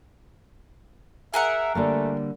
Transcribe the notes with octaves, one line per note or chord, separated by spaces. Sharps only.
G#4 A#4 E5 F#5
D3 G3 A3 A#3